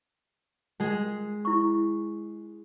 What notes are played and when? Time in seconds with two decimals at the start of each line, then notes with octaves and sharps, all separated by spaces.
0.80 G#3 G#4
1.45 E4 C#6